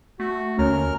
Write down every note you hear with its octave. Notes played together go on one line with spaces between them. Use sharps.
A3 F#4
D#2 D3 C#4 A#4 F6